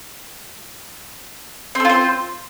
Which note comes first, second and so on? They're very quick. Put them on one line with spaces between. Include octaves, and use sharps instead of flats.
C4 A4 F4 C5